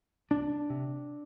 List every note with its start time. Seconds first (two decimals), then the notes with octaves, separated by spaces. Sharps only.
0.31 C2 D4
0.70 C3